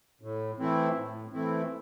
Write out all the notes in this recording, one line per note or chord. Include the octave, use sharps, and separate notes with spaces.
A2
E3 A3 C4 E4
A2
E3 A3 C4 E4